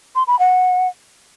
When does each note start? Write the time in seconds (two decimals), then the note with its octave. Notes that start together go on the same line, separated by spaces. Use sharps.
0.16 C6
0.27 B5
0.39 F#5